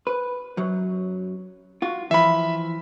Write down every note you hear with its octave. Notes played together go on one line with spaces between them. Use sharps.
B4
F#2 F#3
F4 F#4
E3 F3 E5 B5